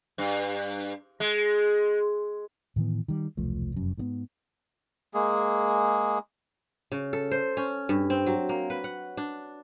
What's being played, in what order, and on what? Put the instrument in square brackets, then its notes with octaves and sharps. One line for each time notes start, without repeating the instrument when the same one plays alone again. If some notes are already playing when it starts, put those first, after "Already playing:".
[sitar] G2
G#3
[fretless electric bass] A2 D#3 E3 B3
D#3 G3
E1 C2 F3 A3
F1 F#2
G#2 D3 B3
[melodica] G#3 A#3 G#4
[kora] C#3
A4
C5
C#4
G2
C4
F#3
A#3
B4
F#5
D4